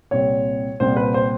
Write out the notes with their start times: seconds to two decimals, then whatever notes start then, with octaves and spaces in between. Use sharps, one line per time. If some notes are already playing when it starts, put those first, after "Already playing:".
0.11 C2 A#2 G3 C4 C#5
0.80 C2 A#2 G3 C4 C5
0.96 B4
1.14 C5